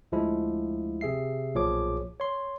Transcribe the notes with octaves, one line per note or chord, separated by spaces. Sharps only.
D2 F3 G#3 E4
C3 G#4 E5 C7
B1 A#2 F3 G#4 C#5 D6
C#5 C6